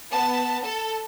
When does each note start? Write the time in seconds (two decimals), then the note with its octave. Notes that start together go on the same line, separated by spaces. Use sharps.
0.11 B3 A5
0.63 A4 A5